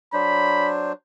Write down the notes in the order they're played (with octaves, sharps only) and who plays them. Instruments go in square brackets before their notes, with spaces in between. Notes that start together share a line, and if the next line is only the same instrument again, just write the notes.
[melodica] F#3 D4 C5 [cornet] B5